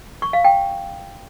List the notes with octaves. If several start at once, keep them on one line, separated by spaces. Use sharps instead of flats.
C#6
F5
G5